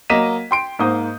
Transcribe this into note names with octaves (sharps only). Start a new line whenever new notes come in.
F#3 A#3 D#5 B6 D#7 E7
G5 C6 D7
G#2 A#3 C5 D#6 G6